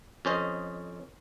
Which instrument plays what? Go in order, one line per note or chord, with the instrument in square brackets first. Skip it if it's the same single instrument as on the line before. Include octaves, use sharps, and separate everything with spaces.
[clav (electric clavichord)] F2 C#4 C5 D#5